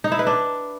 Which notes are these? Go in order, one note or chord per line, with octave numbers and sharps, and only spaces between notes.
D#4
E4
B4
D4